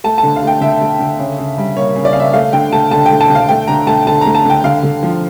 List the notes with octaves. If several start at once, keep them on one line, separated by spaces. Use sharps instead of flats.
A3 A5
A5
D3
F5
A3 G5
D3 E5
A3
D3
C#3
C#3
G3
A#3 C#5
C#3
D5
C#3 F5
E5
A3 F5
D3 G5
A3 A5
D3 A5
A3 G5
A5
D3
F5
A3 G5
D3 A#5
A3 A5
D3 A5
A3 A#5
A5
D3 G5
D3 F5
D3
F3